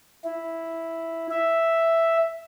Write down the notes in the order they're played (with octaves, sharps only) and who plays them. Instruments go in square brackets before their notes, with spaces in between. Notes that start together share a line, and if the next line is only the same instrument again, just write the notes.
[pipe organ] E4
E5